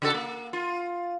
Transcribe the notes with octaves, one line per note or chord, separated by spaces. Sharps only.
C#3 F#4 A4
A#3
F4